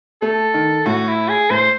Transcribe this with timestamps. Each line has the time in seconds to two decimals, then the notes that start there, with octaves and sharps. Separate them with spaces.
0.22 A3 A4
0.54 D#3
0.86 A2 F#4
1.08 E4
1.28 G#4
1.50 A2 C5